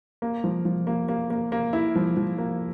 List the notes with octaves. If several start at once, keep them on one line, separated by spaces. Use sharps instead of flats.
A#3
F3
F3
A#3
A#3
A#3
A#3
E4
F3
F3
A#3